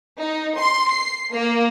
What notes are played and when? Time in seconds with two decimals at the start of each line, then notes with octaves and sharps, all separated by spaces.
0.20 D#4
0.57 C6
0.91 C7
1.31 A#3